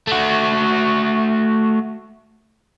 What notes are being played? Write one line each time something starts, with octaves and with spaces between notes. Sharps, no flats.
A3 F#4